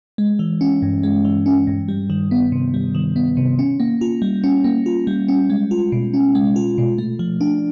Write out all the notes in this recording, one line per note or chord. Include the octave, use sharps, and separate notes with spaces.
G#3
E3
C#4
G2
G#3
E3
C#4
G2
G3
D#3
B3
C3
G3
D#3
B3
C3
C#4
A#3
F4
G3
C#4
A#3
F4
G3
C#4
G#3
F4
B2
C#4
G#3
F4
B2
A3
F3
D4